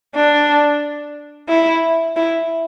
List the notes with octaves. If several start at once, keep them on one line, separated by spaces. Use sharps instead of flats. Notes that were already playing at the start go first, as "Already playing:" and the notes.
D4
E4
E4